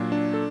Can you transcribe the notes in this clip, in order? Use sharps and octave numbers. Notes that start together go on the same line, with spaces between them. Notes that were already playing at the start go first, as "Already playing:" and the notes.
Already playing: A#2 F#3 D4
D4
A4